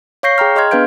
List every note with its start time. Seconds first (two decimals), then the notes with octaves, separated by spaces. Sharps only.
0.23 C#5 F5 C#6 G6 A#6 C7
0.38 G#4 G5 A#5 F6
0.56 G#4 D#5 C6 F6 G#6
0.71 B3 D4 B4 F5 G6 D7